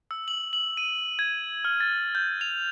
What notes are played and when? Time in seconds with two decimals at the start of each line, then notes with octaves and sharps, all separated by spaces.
0.11 E6
0.28 F#7
0.53 F#7
0.77 D#7
1.19 G#6
1.65 F6
1.80 A6
2.15 G6
2.41 F7